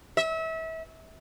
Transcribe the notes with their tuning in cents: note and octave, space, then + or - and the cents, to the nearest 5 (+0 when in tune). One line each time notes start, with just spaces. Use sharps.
E5 -30